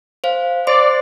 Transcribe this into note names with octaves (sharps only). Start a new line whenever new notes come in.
C5 F5
C5 D5 C6